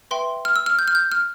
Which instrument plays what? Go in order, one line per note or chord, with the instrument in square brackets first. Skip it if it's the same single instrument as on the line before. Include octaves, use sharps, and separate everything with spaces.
[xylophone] B4 E5 G5 C6
F6
E6
F6
G6
F6
G6
F6